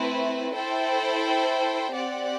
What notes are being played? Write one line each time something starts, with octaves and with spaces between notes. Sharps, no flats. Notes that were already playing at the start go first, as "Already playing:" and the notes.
Already playing: A3 C4 E4 B4
E4 A4 C5 G5
C4 G4 D5 F#5